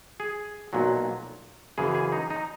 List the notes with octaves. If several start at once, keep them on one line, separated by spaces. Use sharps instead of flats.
G#4
B1 A#2 F#3
F#2 C#3 E3 G#4
G#4
D#4
D#4